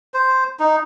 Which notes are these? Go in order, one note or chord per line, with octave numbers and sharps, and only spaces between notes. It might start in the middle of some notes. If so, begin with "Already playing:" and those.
C5
D#4